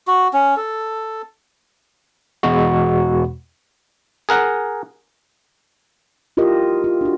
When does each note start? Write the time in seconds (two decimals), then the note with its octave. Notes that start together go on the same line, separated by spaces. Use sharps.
0.08 F#4
0.33 C#4
0.57 A4
2.43 E2 B2 G#3 F#4
4.29 G#4 A#4 F#5
6.37 E4 F4 G4 A#4 D#5
6.84 F4
7.01 D4 F#4